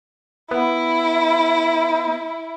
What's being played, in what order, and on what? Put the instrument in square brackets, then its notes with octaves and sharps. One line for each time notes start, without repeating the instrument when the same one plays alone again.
[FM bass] B3 [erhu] E4